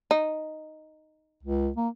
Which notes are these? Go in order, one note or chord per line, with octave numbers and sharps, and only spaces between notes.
D#4
C#2
A#3